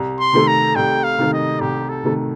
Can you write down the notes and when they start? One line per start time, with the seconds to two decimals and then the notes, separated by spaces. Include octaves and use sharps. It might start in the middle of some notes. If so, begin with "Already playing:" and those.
Already playing: C2
0.20 C6
0.33 C3 D#3 A3
0.48 A#5
0.76 C2 G5
1.04 F5
1.18 C3 D#3 A3
1.33 D#5
1.61 C2 G4
1.89 A4
2.04 C3 D#3 A3